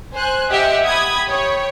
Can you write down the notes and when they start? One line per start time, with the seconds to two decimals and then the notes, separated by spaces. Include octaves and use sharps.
0.14 C5 G#5 F#6
0.50 G4 D#5 E5 F#5
0.86 B5 D#6 G#6
1.28 C#5 G5